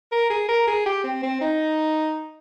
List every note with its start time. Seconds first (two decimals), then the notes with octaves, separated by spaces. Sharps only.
0.12 A#4
0.30 G#4
0.48 A#4
0.67 G#4
0.86 G4
1.04 C4
1.23 C4
1.41 D#4